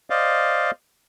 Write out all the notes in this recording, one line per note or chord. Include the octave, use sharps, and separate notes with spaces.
C5 D5 D#5 F5